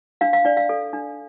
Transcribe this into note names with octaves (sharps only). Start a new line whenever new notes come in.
D4 F5
F5
D4 D5
F5
A4
D4